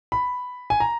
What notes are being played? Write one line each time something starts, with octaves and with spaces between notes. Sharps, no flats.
B5
G#5
A#5